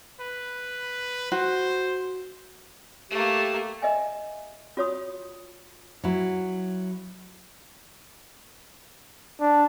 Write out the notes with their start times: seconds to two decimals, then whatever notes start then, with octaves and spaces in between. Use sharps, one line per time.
0.20 B4
1.32 F#4 C5
3.10 A3 A#3 G4
3.82 A#4 D#5 E5 G#5
4.77 F4 F#4 C#5 B5 D#6
6.04 F#3 E4
9.40 D4